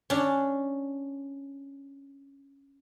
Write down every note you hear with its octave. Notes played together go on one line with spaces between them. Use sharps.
C#4 D4